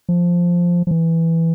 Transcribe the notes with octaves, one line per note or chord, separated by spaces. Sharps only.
F3
F3
E3